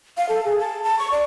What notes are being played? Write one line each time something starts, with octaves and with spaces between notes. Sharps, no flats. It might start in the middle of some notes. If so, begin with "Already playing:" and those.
F5
A4
G#4
A5
A5
C#6
D5